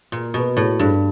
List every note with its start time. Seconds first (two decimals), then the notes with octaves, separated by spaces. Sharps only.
0.12 A#2
0.34 B2
0.57 A2
0.79 G2